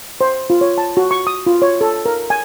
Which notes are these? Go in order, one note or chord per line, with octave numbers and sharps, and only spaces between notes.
C5
F4
C#5
A5
F#4
C#6
D#6
F4
C#5
A4
A#4
G#5